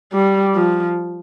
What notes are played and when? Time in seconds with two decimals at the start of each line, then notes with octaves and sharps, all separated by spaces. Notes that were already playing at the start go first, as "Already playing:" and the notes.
0.13 G3
0.55 F3